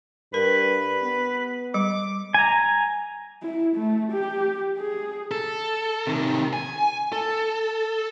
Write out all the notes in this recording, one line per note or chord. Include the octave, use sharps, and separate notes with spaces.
G2 A#4 B4
B3
G3 D6
G#5 A#5
E4
A3
G4
G#4
A4
C3 D#3
G#5
A4